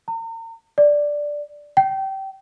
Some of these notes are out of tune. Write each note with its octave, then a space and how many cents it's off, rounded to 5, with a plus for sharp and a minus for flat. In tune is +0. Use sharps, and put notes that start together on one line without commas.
A#5 -40
D5 +0
G5 -25